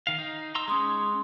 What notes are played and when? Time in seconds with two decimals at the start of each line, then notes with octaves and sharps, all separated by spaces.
0.07 D#3 F5
0.18 D#4
0.55 A#5 C6 E6
0.68 G#3 C#4 C6 D#6